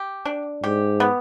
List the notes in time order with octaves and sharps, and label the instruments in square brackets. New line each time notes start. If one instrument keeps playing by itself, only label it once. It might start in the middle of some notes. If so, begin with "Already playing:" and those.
Already playing: [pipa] G4
D4
[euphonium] G#2 [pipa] G4
[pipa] B3